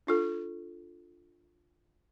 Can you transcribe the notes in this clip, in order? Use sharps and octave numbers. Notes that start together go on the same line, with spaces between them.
D4 F4 A4